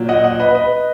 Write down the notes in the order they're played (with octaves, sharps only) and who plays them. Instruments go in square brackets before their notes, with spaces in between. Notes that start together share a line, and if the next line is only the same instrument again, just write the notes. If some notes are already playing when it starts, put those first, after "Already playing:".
Already playing: [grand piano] A#2 F#3
D#5 F#5
D#5 F#5
B4 D#5
B4 D#5